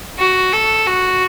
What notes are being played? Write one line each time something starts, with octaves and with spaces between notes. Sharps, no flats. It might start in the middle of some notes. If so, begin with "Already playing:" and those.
F#4
A4
F#4